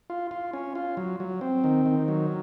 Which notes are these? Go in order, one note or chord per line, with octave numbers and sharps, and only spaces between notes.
F4
F4
C#4
F4
F#3
F#3
C4
D#3
D#3
F#3